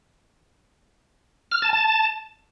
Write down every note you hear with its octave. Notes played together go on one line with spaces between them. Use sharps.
F6
A5
A5